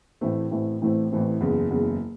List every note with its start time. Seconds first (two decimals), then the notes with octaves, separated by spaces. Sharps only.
0.21 A1 A2 E3 A3 C4
0.51 A1 A2 E3 A3 C4
0.81 A1 A2 E3 A3 C4
1.11 A1 A2 E3 A3 C4
1.41 F#1 E2 C#3
1.71 F#1 E2 C#3